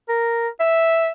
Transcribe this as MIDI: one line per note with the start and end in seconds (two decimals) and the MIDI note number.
0.08 0.48 70
0.60 1.12 76